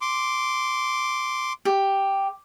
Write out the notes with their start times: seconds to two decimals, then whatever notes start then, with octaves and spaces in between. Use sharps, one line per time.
0.01 C6 D6
1.65 G4